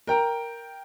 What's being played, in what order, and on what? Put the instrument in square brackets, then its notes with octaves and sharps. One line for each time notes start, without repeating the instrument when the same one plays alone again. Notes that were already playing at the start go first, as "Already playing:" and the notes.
[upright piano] A#4 G5 A#5